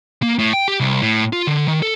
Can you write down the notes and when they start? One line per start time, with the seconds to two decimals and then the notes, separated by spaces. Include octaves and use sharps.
0.23 A#3
0.39 A2
0.53 G5
0.68 G4
0.80 C2
1.02 A2
1.33 F4
1.47 D3
1.68 D#3
1.82 A4